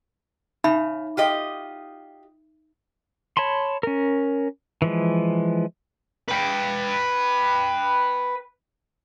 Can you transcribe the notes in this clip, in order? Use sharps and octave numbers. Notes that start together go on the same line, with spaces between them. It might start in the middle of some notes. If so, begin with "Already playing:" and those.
C#3 D#4 E5 B5
F4 G4 D#5
C#5 A5 B5 C6
C#4 A#4
E3 F3 G#3
B4 G5